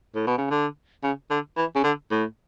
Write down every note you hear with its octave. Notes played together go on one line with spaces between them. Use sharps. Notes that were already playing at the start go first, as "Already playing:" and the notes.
A2
B2
C#3
D3
C#3
D3
E3
C#3
D3
A2